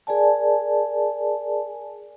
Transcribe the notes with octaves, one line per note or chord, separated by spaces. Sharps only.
G#4 A#4 D5 G#5 A5